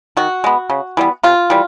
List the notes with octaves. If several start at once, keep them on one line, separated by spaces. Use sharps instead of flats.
D#3 F#4
G#3 B3
C#3
E3 G3 B3
C3 F4
E3 G3